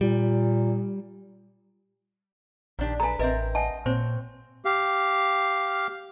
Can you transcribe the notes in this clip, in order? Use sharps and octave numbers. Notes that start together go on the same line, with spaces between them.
A#2 G3
A#1 D#3 D4 G4
A4 B4 G#5 A#5
A1 C4 A#4 B4 D#5 E5
D#5 F#5 G#5 A5
A#2 C4 C5 C#5
G4 F5